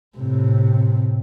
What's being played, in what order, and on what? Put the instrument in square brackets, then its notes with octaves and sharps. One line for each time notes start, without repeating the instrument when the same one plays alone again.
[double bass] A2 C3